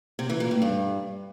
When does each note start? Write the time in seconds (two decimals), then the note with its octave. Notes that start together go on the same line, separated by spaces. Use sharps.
0.19 C3
0.30 E3
0.40 A#2
0.51 A2
0.62 G2